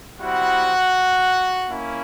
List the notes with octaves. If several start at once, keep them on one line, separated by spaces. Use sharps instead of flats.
G3 C4 E4 F#4 F#5
A#3 C#4 E4